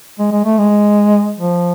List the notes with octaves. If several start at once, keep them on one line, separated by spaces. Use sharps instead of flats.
G#3
G#3
A3
G#3
F3